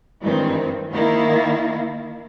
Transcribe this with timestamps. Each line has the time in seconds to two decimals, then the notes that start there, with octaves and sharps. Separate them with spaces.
0.21 G2 D#3 E3 C4
0.92 D#3 A#3 E4